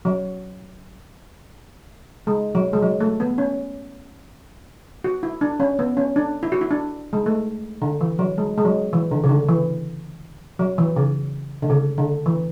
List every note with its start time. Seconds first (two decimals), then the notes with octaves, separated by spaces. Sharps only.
0.05 F#3
2.27 G#3
2.55 F#3
2.73 G#3
2.82 F#3
3.01 A3
3.20 B3
3.38 C#4
5.04 F#4
5.23 E4
5.41 D4
5.60 C#4
5.79 B3
5.97 C#4
6.16 D4
6.43 E4
6.52 F#4
6.61 E4
6.71 D4
7.13 G#3
7.26 A3
7.82 D3
8.01 E3
8.19 F#3
8.38 G#3
8.58 G#3
8.65 F#3
8.93 E3
9.11 D3
9.24 C#3
9.29 D3
9.48 E3
10.59 F#3
10.78 E3
10.96 C#3
11.62 D3
11.70 C#3
11.98 D3
12.26 E3